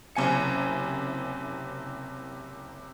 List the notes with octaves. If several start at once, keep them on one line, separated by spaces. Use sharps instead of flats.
F#1 C3 G#5 C#7